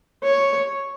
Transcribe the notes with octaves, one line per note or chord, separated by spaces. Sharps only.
C#5